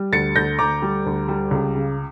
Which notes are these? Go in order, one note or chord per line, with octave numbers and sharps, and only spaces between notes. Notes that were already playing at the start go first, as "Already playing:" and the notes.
Already playing: G3
D2 A6 C#7
D2 G6 A#6
D2 A#5 D6
G3
D2
G3
C#2
C#3